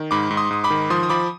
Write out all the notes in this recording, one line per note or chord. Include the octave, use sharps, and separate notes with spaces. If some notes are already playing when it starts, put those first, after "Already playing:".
Already playing: D#3
G#2 B5 D6
G#2
C6 D#6
G#2 D#6
B5 D6
D#3
F3 C6 D#6
D#6
F3 B5 D6